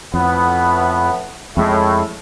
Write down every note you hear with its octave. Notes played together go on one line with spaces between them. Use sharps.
F2 A2 B3
F2 A2 G#3